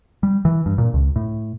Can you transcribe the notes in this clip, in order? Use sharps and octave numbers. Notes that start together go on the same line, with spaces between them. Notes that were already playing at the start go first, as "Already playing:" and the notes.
G3
E3
G2
A#2
C#2
A2